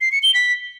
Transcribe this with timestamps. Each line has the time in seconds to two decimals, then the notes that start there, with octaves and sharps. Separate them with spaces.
0.01 C7
0.12 C#7
0.23 G7
0.34 B6